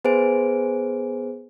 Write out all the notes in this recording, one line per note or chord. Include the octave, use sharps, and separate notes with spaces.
B3 G#4 B4 C5 G#5 D7